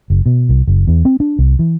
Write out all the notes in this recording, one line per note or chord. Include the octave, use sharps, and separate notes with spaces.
F#1
B2
C2
F#1
E2
C4
D4
C2
E3